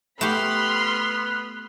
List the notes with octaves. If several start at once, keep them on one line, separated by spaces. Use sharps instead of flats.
A3 B3 G4 B5 C6 F6